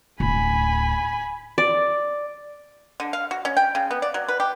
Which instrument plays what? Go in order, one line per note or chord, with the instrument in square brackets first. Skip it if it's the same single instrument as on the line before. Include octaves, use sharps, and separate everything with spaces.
[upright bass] D1 [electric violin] G#5 B5
[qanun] D5
[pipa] D3
F5
F#4
C#4
G5
C#3
B3
D5
F#3
B4
G4